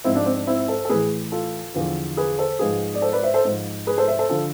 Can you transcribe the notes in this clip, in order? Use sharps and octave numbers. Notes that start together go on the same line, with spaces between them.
G#2 F3 C4 E4
D4
C4
D4
C4 E4
A4 C5
A4
A2 E3 G#4 B4
F4 A4
E2 D3 F3
G#4 B4
A4 C5
G#2 F3 G#4 B4
D5
A4 C5
B4 D5
C5 E5
A4 C5
G#2 F3
G#4 B4
A4 C5
C5 E5
A4 C5
D3 F3 F4 A4